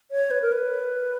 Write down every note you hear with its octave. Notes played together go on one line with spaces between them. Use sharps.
C#5
B4
A#4
B4